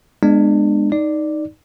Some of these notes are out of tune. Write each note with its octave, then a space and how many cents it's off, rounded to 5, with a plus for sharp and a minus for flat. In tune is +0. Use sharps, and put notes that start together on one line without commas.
G#3 +0 B3 +5 D4 +30
D#4 +0 D5 +0